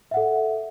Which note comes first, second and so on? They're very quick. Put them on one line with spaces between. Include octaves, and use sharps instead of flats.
E5 F#5 A4